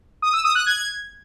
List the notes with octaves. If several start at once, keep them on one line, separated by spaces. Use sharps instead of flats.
D#6
E6
D#6
F#6
G#6